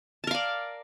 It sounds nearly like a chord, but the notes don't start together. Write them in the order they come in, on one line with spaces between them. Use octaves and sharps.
A5 A#4 F5 D5